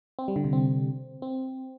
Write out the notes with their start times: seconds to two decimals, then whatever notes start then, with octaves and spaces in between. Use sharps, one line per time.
0.19 C4
0.28 G3
0.36 D3
0.45 C3
0.53 C4
1.22 C4